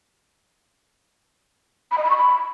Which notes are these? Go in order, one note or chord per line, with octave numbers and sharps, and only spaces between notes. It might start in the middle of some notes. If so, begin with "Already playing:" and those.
B5
D#5
B5
C#6
B5